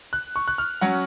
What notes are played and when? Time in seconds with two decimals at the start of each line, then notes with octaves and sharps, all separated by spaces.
0.13 F#6
0.36 C#6
0.48 F#6
0.58 F6
0.81 F#3 C#4 F#5